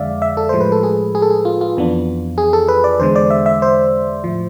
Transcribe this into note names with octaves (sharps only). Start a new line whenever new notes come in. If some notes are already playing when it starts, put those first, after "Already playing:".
Already playing: F2 D3 G#3 D5 E5 F5
E5
A4
A2 F3 G#3 C5
B4
A4
G#4
G#4
A4
G#4
F4
F4
F2 E3 B3 D4
G#4
A4
B4
D5
E2 D3 G#3 C5
D5
E5
E5
C5
A2 F3